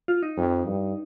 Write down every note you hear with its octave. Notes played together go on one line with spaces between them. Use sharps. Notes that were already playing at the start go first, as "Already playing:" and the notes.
F4
D#4
F2
G2